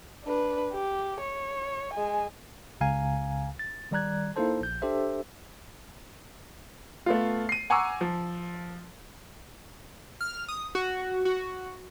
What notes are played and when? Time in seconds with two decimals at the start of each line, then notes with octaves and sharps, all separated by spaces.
0.24 D4 B4
0.73 G4
1.20 C#5
1.93 G#3 G#5
2.81 C#2 C#3 F5 G#5 A#5
3.59 A6
3.91 D#3 G3 D5 A#5 F#6 G#6
4.36 A#3 D#4 E4 A4 C5 A5
4.61 A#1 G6
4.82 D4 G4 A4 C5 E5
7.06 A3 B3 F4
7.49 C7 D#7
7.70 F#5 G#5 A#5 C#6 D6 E6
8.01 F3
10.21 F6
10.48 D#6
10.75 F#4
11.25 F#4